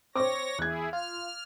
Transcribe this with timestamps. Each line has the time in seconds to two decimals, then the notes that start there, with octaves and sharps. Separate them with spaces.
0.16 C4 C5 C#5 C#6 D6 A#6
0.59 E2 E4 G#4 F#6 G#6
0.93 F4 F6